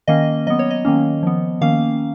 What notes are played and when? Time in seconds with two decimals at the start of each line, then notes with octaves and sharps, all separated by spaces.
0.08 D#3 A#3 C#4 D#5
0.47 F#3 B3 D#5
0.59 C#5
0.71 D#5
0.85 D#3 A#3 C#4
1.23 F3 B3
1.61 D#3 A#3 C#4 F5